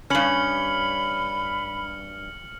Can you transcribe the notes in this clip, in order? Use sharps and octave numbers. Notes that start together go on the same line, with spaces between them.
G2 C#4 B5 F6 C#7 F#7